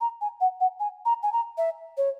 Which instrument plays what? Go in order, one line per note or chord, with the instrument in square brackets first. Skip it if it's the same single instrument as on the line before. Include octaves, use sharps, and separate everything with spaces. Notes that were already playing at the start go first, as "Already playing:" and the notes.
[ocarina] A#5
G#5
F#5
F#5
G#5
A#5
G#5
A#5
E5
C#5